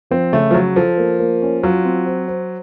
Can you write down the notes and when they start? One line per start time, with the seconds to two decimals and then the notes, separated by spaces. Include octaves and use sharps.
0.11 F3 C4
0.33 C#3 A3
0.51 F3
0.54 C#3 F#3
0.76 F3 A4
0.97 A#3
1.19 A#3
1.42 C#4
1.63 F#3 F4
1.85 C4
2.06 C5
2.28 C5